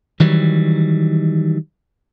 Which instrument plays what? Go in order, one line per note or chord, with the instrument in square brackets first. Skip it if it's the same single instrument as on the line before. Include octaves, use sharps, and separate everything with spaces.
[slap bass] D#3 E3 F#3 G3